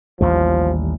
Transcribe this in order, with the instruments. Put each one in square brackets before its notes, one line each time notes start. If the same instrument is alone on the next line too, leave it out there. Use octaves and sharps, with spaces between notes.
[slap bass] A1 D#2 G3 [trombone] F3